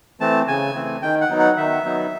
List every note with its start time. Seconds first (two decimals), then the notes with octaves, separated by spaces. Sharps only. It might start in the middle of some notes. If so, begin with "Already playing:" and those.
0.20 E3 A3 C4 A5
0.48 C#3 G#5
0.75 E3 A3 C4
1.02 D#3 G5
1.21 F#5
1.30 F#3 B3 D#4
1.39 F#5
1.57 D#3 E5
1.85 F#3 B3 D#4